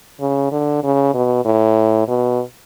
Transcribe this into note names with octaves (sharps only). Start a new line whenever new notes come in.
C#3
D3
C#3
B2
A2
B2